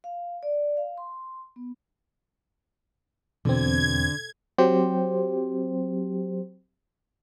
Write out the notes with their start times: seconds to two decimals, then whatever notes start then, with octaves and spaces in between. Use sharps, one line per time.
0.04 F5
0.43 D5
0.77 F5
0.98 C6
1.56 B3
3.45 E2 B2 D3 C4 G#6
4.58 F#3 C4 G4 C5